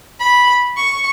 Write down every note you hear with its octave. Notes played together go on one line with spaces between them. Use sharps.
B5
C#6